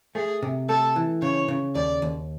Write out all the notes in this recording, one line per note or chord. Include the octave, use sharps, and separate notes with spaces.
A3 G#4
C3
A3 A4
E3
C#3 C#5
C#3
D#2 D5
D#2